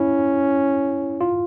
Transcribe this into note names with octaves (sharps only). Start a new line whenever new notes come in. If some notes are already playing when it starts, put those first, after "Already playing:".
Already playing: C#4 E4
F4